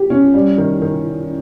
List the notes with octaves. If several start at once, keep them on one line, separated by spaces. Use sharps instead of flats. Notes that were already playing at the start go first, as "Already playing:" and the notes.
Already playing: G4
C#4
G3
D#3
D#3